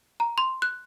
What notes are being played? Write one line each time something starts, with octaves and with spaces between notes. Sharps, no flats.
A#5
C6
F#6